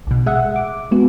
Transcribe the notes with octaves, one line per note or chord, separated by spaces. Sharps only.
B1 B2
G#3 E5 F#5
D6
G#3 B3 F#4